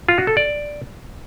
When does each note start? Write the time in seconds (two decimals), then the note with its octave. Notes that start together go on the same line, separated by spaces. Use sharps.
0.09 F4
0.18 F#4
0.27 A4
0.37 D5